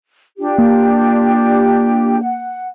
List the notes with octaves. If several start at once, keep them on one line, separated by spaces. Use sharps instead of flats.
D4 F4 G4
A#3
F#5